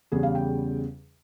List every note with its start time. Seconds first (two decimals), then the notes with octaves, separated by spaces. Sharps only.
0.12 E2 C#3 G3 G#4
0.23 F5
0.35 G5